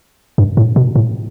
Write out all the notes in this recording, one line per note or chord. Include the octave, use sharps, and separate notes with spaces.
G2
A2
B2
A2